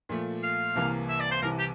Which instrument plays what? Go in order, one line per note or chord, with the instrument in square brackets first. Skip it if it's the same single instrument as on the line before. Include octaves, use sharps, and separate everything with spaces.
[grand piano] A#2 F3 A3
[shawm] F5
[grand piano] C2 C3 E3 A#3
[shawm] E5
D5
C5
[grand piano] C2 C3 E3 [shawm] A#4
[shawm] G4